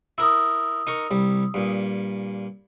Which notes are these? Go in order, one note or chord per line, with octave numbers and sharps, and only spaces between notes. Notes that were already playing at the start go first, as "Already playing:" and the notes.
E4 A#4 D#6 E6
D#4 A#4 C#6
C2 G3
G2 A#2